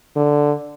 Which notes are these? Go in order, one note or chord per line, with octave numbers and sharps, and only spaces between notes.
D3